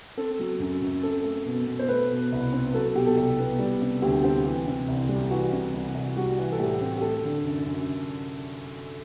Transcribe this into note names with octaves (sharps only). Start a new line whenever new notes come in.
C4 A4
F#3
F#2
F#2
C4 A4
A3
B2
B2
C5
A3 B4
B2
C2
C4
F#3 A4
B2 G4
A4
C2
B3
G3
C3
D2 G4
C4 G4
E3
C3
C2
G3
E3 F#4
C3
C2
C2
G3 F#4
E3
A4
A2 G4
C4
G4
A3 A4
D3
F#2
F#2